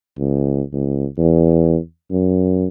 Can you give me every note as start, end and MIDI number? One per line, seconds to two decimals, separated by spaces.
0.18 0.62 37
0.72 1.06 37
1.18 1.77 40
2.11 2.68 42